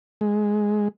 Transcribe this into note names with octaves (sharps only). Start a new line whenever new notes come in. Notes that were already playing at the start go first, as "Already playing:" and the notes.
G#3